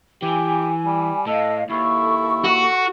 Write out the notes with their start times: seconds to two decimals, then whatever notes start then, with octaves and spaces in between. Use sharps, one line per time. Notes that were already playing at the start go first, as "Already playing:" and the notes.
0.22 E3 G4 G#5
0.85 G3
1.27 A2 A4 D#5 F5
1.70 D#2 E4 A4 C#6
2.45 F#4